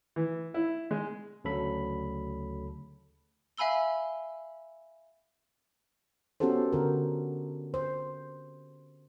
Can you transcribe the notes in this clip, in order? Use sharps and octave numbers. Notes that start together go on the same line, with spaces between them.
E3
E4
G#3
D2 C#3 F#3 A4 B5
E5 F5 G#5 B5 E6 G7
B3 C#4 F#4 G4 A4 C5
D3 F#4 A#4
C5